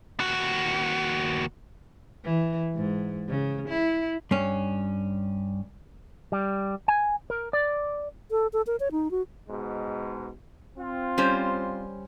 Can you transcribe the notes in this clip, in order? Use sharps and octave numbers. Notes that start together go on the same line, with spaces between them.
D#2 F#4
E3
G#2
C#3
E4
G2 C#4
G3
G#5
A#4
D5
A4
A4
A#4
C#5
D#4
F#4
G#2 B2 G#3
C4 F4
G3 C#4 C5